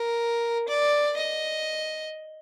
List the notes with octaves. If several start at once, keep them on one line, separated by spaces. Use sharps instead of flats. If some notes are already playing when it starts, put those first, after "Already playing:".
Already playing: A#4
D5
D#5